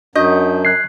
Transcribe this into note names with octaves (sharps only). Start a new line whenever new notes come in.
F#2 D4 F#4 D#5 G6
F#6 G#6 C7